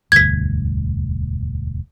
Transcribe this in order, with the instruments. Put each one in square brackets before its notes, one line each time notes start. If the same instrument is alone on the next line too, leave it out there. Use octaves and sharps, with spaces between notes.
[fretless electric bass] E1 D2 G2 [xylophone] G#6 B6